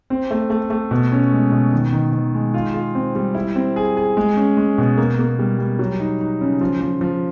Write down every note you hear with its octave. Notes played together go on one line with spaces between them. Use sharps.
C4
A3
A3
A3
B2
C#4
G#3
B2
D#3
D#3
D#3
G#3
F4
F4
C4
G3
E4
C4
G#4
G#4
G#3
C#4
G#3
B2
A#3
A#3
G3
G3
F#3
D#4
D#4
C#3
F3
F3
F3